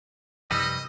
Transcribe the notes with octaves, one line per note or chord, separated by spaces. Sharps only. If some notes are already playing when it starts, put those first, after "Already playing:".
F#2 C3 F3 G3 D#4 B4 D#5 E6